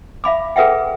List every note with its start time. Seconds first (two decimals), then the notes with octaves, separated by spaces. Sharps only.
0.24 E5 F5 B5 D6
0.56 G#4 A4 B4 E5 F#5 G5